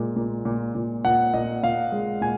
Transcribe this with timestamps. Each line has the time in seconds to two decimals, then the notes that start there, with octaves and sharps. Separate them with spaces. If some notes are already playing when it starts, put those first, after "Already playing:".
Already playing: A#2 G#3
0.16 A#2
0.45 A#2
0.75 A#2
1.05 A#2 F#5
1.34 A#2 D#5
1.63 A#2 F5
1.92 G#3
2.21 A#2 G#5